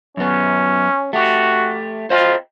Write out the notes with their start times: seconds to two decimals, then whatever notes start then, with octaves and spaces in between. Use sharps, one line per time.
0.17 F#2 B3 C#4
1.13 A3 F#4 G4
2.10 F4 C5 D#5 G5